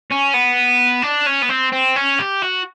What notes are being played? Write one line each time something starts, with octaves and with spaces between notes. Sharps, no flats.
C#4
B3
D4
C#4
B3
C4
C4
C#4
G4
F#4